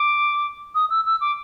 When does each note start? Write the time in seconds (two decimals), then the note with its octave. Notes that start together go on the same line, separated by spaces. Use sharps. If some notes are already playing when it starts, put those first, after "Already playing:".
Already playing: D6
0.75 D#6
0.90 E6
1.05 E6
1.21 D6